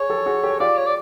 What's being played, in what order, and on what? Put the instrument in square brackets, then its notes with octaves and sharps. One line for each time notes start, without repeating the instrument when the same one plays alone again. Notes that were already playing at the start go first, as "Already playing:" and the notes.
Already playing: [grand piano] G#4 [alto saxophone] C#5
[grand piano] G4 A4
F#4 G#4
G4 A4
[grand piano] F4 G4 [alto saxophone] D5
[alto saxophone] C#5
D5